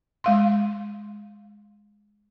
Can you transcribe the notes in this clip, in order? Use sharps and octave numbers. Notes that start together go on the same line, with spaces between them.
G#3 F5 C6